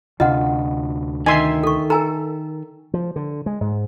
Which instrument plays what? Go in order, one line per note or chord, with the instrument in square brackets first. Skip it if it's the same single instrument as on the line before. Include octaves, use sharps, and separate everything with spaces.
[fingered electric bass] D2 C3 D4 [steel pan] F4 [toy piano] D#5 F#5
[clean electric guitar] D#3 E5 [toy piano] D#5 [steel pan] G#5 C6
[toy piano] A4 C#6
[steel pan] A4 [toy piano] A#4 G#5 A#5
[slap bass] F3
D3
G#3
G#2